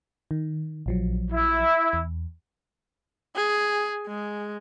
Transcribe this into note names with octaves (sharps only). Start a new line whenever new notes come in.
D#3
A#1 F3 F#3
E4
E2
G#4
G#3